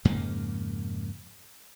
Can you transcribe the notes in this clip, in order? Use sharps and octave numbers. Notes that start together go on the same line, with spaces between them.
F2 G#2 C#3 A#3